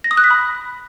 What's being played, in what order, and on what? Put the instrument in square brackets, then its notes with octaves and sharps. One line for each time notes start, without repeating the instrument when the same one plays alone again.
[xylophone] A#6
D#6
F#6
B6
B5